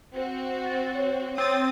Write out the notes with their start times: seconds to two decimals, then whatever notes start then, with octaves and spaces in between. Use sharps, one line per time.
0.15 C4 F#4
0.65 A6
0.95 C#5
1.38 C4 D#6 A6